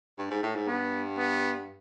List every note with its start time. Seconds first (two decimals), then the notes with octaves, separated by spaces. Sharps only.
0.18 G2
0.30 G#2
0.43 A2
0.55 G#2
0.68 G2 B3
1.18 B3